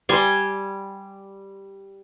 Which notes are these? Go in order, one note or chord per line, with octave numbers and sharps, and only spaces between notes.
G3 G#5 C6